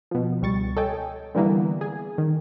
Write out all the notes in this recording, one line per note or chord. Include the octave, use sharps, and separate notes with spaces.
B2 F3
C#2 G3 C#6 A6
A4 C#5 D#5 G5 G#5
D3 E3 G3 A#3 B3 E4
G#4
D#3